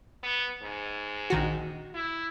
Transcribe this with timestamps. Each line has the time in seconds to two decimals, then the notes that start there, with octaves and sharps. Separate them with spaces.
0.23 B3
0.62 G#2
1.30 A#1 D#3 F#4
1.94 E4